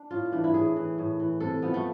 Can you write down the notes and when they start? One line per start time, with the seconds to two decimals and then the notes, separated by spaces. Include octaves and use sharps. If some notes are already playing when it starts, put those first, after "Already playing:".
Already playing: D4
0.11 A2 F4
0.32 E3 D4
0.44 E4
0.54 A2 G#4
0.76 E3
0.98 A2
1.19 E3
1.40 C3 A4
1.62 F3 B3
1.74 A3